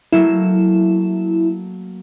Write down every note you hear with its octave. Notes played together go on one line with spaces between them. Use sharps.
F#3 A3 A#3 E4